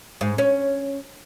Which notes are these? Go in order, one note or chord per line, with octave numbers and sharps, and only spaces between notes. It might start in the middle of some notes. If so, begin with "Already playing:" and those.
G#2
C#4